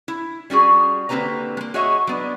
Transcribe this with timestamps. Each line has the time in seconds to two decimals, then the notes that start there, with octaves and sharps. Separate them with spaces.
0.08 E4
0.50 G3 C#4 F#4 G#4
1.09 D3 A#3 C4 G4 B4 A#5
1.57 G#3 A#3
1.74 F#4 G#4 C#5 D#5 E5
2.07 F#3 B3 D4